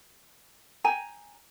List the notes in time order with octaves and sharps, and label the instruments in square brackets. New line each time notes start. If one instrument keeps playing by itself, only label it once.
[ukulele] G5 G#5 A#5